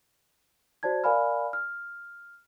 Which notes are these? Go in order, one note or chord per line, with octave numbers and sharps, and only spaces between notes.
F#4 C5 D5 A5 G#6
A#4 D5 F5 G#5 B5 F6
F6